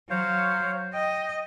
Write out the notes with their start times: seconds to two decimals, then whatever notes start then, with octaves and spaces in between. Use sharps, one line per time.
0.10 F#3 C5 C#5 F5
0.94 D#5 G5